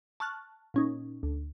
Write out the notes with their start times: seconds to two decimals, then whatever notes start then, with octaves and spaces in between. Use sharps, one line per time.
0.20 A5 C#6 F6 F#6
0.74 A#2 C#4 D#4
1.23 D2